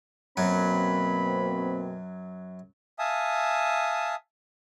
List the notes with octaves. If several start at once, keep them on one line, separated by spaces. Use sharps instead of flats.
F#2 B2 F#3 A#3 C4 B5
E5 F5 G#5 A5 D#6